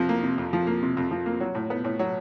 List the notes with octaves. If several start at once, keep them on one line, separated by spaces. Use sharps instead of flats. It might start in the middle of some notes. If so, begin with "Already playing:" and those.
Already playing: F2 C3 F3
A#3
C3
F2
F3
A#3
C3
F2
F3
A#3
F#3
A2
B3
A2
F#3